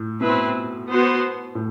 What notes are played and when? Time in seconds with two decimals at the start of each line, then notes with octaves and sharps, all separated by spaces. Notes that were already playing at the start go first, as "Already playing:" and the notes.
Already playing: A2
0.21 B2 C4 E4 B4
0.91 B3 F#4 C5
1.55 A2